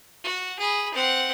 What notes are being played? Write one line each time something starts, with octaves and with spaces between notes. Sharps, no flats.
F#4
G#4 B5
C4 F#5